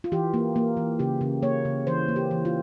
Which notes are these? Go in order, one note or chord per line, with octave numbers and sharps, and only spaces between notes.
F4
E3 G4
A#3
A#3
E3
C#3 G4
C#3
A#3 C#5
C#3
E3 C5
A#3
G4
E3
F4